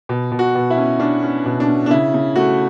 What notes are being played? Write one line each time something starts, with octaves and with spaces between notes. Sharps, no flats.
B2
B2
F#4
B2
E4
C#4
C#4 D4
C#4
B2
D4
C#4
D4
C#3 E4
C#3
A3 F#4